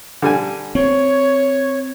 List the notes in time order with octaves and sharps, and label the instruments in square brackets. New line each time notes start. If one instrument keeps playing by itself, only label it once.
[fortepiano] D3 G3 G#5
[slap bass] C4 [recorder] C#5